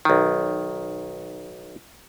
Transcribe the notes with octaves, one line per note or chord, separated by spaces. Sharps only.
B1 D#3